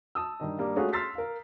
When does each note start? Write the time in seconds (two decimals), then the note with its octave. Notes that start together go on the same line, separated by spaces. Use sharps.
0.15 A5 D#6 E6
0.40 G2 D#3 D#5
0.59 G2 G3 A#3
0.76 G#3 A3 C#4 F4 F#4 G#4
0.93 C6 E6 F6 A6 B6 C7
1.15 A#4 F5